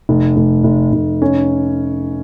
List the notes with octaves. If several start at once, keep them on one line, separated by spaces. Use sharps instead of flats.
F1
F1
F1
F1
C#4